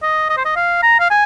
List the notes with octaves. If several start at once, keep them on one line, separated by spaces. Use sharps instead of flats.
D#5
D#5
C5
D#5
F5
A#5
F5
G#5